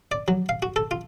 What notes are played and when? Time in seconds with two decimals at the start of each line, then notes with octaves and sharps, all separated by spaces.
0.12 D5
0.28 F#3
0.49 F5
0.62 F#4
0.76 A4
0.91 F4